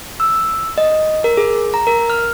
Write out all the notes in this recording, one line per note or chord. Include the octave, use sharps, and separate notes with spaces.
E6
D#5
A#4
G#4
A#5
A#4
F6